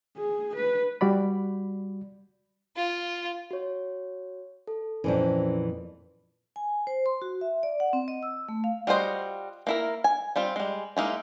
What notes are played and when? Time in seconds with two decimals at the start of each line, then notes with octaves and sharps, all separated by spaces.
0.17 G#4
0.55 B4
1.01 G3 F#4 D5 B5
2.77 F4
3.51 F#4 C#5
4.67 A4
5.04 F2 A#2 E3 C#4 A#4 C5
6.56 G#5
6.87 C5
7.06 C6
7.22 F#4
7.41 E5
7.63 D5
7.80 F#5
7.93 C4
8.08 D#5
8.23 E6
8.49 A3
8.64 F5
8.87 G3 F4 F#4 C5 D#5
9.67 A#3 E4 A#4
10.04 G#5
10.36 G3 C4 F4
10.56 G3 G#3
10.97 G#3 A#3 D#4 E4